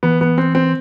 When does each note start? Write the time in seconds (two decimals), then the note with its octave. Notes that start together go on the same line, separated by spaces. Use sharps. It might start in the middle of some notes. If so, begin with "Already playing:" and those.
0.03 E3 B3
0.21 B3
0.38 C4
0.55 C4